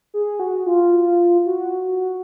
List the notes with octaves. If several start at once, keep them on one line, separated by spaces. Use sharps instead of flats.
G#4
F#4
F4
F#4